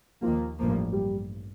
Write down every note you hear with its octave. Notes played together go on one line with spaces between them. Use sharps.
D#2 D#3 F3 A#3 F4
A1 G2 F3 A#3
G3 G4